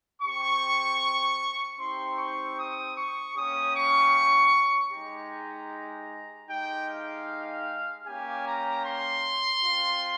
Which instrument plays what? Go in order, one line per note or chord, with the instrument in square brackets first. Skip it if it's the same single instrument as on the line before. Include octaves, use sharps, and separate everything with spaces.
[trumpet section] C4 G4 C#6
C4 D#4 G4 C6
C#6
D#6
C#6
A#3 C#4 G4 D#6
C#6
G#3 D#4 G4 A#5
G#3 D#4 G4 G5
F5
A#3 C#4 G4 G#5
A#5
C6
C4 F4